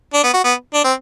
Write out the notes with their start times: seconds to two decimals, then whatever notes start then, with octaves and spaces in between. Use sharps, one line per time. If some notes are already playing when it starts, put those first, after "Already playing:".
0.14 D4
0.24 B3
0.34 F#4
0.44 B3
0.74 D4
0.84 C4